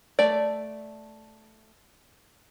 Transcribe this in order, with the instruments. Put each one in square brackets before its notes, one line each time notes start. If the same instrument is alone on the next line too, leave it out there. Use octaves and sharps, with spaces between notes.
[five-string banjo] A3 D5